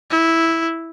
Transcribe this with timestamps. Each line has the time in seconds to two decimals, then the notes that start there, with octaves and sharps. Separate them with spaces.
0.11 E4